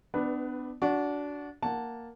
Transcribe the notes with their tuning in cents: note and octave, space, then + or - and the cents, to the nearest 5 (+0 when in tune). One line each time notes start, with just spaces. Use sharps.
B3 +30 D4 +15 B4 +0
D4 -20 F#4 +0
A#3 +0 F#5 +0 A5 +0